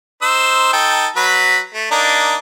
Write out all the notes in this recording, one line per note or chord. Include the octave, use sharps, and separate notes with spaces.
D#4 C5 E6
D#4 A4 G5
F#3 B4 B5
A3
A#3 D4 D#4